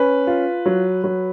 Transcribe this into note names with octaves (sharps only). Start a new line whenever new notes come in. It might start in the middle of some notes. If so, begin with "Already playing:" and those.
Already playing: C#4 B4
F4
F#3
F#3